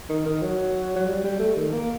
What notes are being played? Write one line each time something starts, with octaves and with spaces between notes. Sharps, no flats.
D#3
D#3
F#3
F#3
G3
G3
A3
D#3
A#3